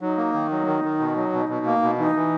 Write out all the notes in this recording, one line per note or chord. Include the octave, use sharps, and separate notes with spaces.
F#3 D#4
A#3
D#3
F#3
D#3
D#3
B2
F#3
B2
B2
A#3
B2
E3 D#4
E3